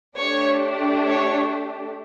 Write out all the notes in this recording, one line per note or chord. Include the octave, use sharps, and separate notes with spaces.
A3 D4 G4 C#5
C#5